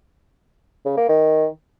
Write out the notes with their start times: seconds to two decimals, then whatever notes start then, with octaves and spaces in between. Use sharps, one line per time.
0.86 C#3
0.97 A#3
1.09 D#3